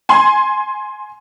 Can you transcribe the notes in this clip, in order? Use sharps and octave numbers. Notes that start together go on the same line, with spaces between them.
G#5 C6